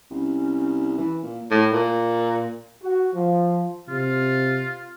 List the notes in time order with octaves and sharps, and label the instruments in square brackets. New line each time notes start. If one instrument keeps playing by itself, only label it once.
[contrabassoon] C2 [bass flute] C#4
[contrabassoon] E3
A#2
[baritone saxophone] A2
A#2
[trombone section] F#4
F3
[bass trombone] C3 [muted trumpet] F4